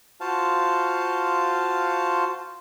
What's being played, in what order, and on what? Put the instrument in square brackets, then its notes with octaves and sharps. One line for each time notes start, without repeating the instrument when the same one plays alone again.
[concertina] F4 F#4 C5 F5 A5